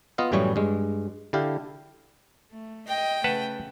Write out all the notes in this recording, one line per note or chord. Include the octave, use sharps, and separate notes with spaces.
B3 F4 D#5 F5
F#2 A2 E3 G3 C#5 G#5
G2 G#3
D3 E4 G4 F5
A3
D#5 G5
C#3 A3 B4 F#5 A5